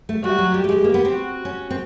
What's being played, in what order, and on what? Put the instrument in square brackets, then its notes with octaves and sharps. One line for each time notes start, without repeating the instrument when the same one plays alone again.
[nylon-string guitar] A3
[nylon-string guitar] G3 [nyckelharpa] F#4
[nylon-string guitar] F#3
[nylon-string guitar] G3 [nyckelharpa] G4
[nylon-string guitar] A3
G#3
A#3
B3
C4
[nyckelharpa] F#4
[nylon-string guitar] C#4
C4